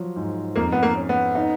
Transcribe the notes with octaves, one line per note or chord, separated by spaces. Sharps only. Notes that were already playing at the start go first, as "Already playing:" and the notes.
Already playing: F3 F#3
G#2
F2 A#3
B3
A#3
C#4
B3
D#4